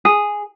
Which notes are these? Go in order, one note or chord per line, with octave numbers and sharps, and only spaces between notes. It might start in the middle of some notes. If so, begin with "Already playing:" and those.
G#4